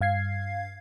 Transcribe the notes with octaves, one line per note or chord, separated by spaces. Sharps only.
G2 F5 G#6 C7